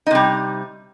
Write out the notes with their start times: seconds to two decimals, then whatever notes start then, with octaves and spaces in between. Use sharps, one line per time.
0.07 D#4
0.11 C3
0.15 G3